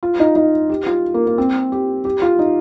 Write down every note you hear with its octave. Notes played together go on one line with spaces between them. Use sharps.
F4
D#4
D#4
G4
F4
A#3
A#3
C4
G4
G4
F4
D#4